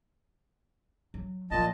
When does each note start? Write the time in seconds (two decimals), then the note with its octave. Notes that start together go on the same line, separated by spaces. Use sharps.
1.14 F#3
1.51 A#2 F3 D#5 A5